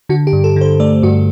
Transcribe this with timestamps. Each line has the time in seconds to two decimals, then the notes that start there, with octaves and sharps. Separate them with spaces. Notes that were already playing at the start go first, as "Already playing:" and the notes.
0.09 D3 F#4
0.27 G4
0.33 G2
0.44 A4
0.56 D3 C5
0.80 A3 D5
1.03 G2 F#4